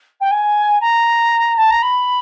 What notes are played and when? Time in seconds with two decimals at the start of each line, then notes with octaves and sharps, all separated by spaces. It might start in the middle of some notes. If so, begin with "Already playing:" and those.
0.20 G5
0.31 G#5
0.80 A#5
1.57 A5
1.70 A#5
1.82 B5